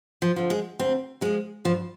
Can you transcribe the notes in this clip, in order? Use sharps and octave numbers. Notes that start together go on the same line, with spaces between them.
F3
D3 F3
G#3
D2 C4
D3 F3 G#3
G2 F3